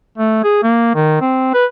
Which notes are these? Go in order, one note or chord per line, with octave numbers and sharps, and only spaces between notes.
A3
G#4
A#3
D#3
C4
B4